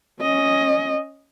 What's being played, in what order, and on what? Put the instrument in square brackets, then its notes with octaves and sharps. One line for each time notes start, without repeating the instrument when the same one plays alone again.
[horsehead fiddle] C#4 D#5